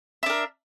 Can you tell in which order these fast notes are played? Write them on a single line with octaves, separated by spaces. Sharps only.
E5 D4 A#4